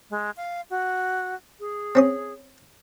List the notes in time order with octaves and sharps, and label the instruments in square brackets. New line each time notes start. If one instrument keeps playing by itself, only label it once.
[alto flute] G#3
F5
F#4
G#4
[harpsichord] C4 C#4 D#6